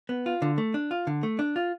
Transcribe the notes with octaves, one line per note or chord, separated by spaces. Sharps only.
B3
F4
D3
A3
D4
F4
D3
A3
D4
F4